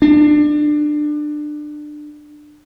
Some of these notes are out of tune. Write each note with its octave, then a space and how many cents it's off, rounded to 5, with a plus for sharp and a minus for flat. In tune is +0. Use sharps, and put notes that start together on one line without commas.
D4 +25